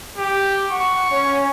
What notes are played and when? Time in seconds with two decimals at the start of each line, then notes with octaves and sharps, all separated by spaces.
0.18 G4
0.70 F#5 C#6
1.10 C#4 G#5